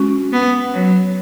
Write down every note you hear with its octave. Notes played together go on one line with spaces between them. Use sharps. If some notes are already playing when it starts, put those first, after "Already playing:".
Already playing: G#3 C#4 F#4
B3
F#3